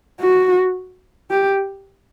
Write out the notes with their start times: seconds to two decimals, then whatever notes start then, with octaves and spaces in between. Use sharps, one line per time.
0.20 F#4
1.31 G4